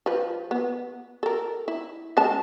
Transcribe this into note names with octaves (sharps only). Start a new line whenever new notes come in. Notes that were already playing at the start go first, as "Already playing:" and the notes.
F3 B4
B3
A4 A#4
E4
G#3 C#4 A5